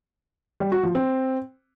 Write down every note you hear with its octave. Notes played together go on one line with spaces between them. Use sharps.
G3
F#4
F3
C4